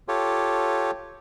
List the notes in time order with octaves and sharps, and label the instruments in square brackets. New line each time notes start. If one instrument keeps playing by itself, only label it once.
[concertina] F4 G4 A4 C#5